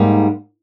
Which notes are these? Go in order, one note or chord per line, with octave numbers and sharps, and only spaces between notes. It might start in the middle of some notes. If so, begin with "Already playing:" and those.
Already playing: G#2 G3 A#3 D#4